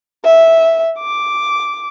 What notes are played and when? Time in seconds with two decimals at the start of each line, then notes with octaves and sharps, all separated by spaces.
0.25 E5
0.99 D6